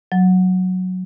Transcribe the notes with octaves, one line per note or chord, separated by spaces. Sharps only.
F#3